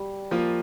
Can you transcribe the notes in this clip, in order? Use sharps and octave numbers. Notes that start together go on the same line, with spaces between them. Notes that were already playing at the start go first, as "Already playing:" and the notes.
Already playing: G3
F3 A#3 F4